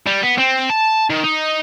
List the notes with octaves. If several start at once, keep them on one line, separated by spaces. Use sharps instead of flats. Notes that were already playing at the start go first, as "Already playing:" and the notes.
G3
B3
C4
A5
D#3
D#4